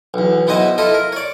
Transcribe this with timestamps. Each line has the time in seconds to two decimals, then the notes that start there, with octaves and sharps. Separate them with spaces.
0.14 B1 E2
0.47 B1 B3 E4 C5 D#5
0.78 E4 F4 A4 D#5
0.94 A#4
1.12 C#5 D5